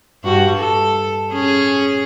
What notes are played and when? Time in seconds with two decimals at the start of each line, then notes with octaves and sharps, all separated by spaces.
0.24 G2 F#4
0.57 A4
1.31 C#4 G#4